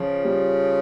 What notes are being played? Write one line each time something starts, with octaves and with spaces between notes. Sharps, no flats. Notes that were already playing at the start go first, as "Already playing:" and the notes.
Already playing: C#3 F3
G3